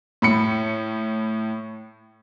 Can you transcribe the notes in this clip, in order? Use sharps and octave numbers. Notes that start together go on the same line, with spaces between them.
A2 B5 C#7